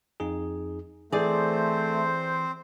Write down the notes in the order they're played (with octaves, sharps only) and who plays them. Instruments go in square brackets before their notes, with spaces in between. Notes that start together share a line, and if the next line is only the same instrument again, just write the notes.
[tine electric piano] F2 D#4 G#4
[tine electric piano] E3 [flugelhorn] A3 [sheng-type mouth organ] C4 C5 [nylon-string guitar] G#4 D5